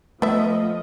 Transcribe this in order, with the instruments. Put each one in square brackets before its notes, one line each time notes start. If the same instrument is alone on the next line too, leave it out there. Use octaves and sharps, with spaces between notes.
[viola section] F3 D#5 [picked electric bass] A3 [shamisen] B3 E5